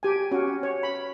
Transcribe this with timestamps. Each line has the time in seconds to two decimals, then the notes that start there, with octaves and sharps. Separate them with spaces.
0.03 G4 G#5
0.31 C#4 F#4
0.63 C#5
0.83 B5